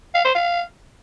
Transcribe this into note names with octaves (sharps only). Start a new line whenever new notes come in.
F5
C5
F5